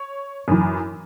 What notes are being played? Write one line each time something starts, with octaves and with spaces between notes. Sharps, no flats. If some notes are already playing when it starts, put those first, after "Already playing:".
Already playing: C#5
F#2 E3